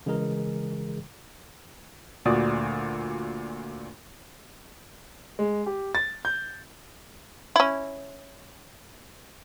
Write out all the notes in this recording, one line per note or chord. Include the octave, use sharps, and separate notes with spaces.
C#3 E3 G#3 G#4 A#4
D2 A#2 F#4 D5 D#6
G#3
G4
A6
G6
C#4 E4